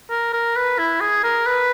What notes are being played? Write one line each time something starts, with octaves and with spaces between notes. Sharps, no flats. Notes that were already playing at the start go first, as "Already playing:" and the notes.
A#4
A#4
B4
E4
G#4
A#4
B4